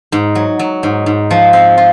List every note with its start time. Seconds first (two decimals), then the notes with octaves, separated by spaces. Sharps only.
0.12 G#2
0.35 F#3
0.59 F#3
0.83 G#2
1.06 G#2
1.31 F3
1.53 C4
1.77 F4